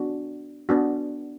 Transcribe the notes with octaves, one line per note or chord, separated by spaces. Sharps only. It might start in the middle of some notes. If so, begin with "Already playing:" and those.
Already playing: B3 D4 F#4
B3 D4 F#4